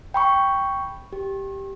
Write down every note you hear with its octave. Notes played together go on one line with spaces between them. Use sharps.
G5 B5 C#6
G4